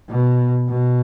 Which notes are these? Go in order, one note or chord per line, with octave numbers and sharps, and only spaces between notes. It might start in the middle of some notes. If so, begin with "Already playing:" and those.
B2
B2